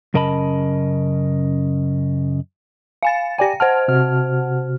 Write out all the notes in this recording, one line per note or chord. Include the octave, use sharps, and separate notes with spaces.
F#2 C#3 A#4 D#5 A5 B5
F5 G#5 A6
G4 D5 G5 G#5 A#6
C5 F#5 A5 F6
C3 F#4 F6